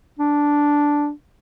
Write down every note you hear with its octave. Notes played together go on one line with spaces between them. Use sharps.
D4